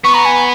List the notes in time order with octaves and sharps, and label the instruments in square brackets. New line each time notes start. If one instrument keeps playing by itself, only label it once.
[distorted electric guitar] B3 [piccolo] C#6
[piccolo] A#5
G#5